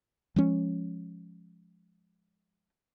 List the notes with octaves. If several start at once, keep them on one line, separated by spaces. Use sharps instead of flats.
F3 G#3 C#4